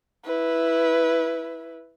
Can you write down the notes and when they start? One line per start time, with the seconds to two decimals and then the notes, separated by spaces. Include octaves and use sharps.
0.24 E4 B4